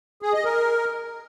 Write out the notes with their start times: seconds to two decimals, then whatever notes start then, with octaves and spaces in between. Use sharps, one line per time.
0.22 G#4
0.33 D#5
0.45 A#4